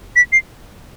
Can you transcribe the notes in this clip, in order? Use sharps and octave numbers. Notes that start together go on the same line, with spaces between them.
B6
C7